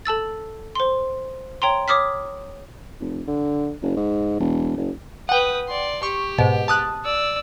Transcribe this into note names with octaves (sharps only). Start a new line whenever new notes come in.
A4 A5 E6 A6
C5 C6
C#5 G5 A#5 C6
C#5 D6 D#6 F6 B6
F1
D3
F#1
G#2
E1
F#1
B4 F#5 G5 D#6
D5 C6
G4 C#6
G#2 B2
A5 D#6 F#6
D5 E6